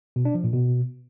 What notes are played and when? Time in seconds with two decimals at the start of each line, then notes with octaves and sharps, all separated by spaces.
0.16 B2
0.25 D4
0.35 F3
0.44 A#2
0.53 B2